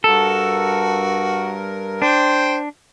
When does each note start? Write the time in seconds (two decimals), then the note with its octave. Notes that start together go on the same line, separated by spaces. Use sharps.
0.04 G2 F#4 A4 A#4
2.02 D4 C5 G5